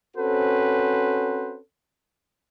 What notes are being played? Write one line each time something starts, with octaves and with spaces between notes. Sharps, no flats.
C4 C#4 F#4 A4 B4 C5